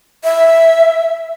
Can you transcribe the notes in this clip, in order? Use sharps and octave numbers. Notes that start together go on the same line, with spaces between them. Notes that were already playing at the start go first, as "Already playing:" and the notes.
E5